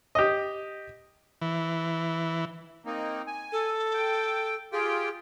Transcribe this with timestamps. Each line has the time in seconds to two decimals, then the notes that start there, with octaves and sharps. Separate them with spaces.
0.15 G4 D#5
1.41 E3
2.86 A#3 C4 D#4
3.27 G#5
3.52 A4
3.94 G5
4.73 F4 G4 G#4 G5